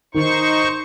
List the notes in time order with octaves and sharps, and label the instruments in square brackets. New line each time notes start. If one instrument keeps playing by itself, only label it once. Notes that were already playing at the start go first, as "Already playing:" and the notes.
[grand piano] D#3 [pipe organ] D#4 C5 C#6